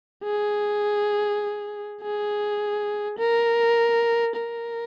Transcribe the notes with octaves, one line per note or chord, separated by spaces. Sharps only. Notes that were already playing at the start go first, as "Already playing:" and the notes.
G#4
G#4
A#4
A#4